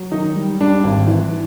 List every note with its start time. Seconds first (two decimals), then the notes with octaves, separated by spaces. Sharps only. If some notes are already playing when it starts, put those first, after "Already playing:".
Already playing: F#3
0.12 D#3 D#4
0.35 G3
0.60 G3 D4
0.84 G#1
1.07 E3